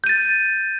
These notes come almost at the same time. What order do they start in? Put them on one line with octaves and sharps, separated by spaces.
G6 D#7 A6